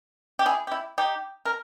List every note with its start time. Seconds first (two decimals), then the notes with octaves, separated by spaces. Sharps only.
0.39 G4
0.46 E4 G#4
0.67 G4
0.71 E4
0.98 D#4 G4
1.45 A#4